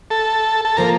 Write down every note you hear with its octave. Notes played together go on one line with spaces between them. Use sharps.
A4
A4
C3 F3 A#3 A#4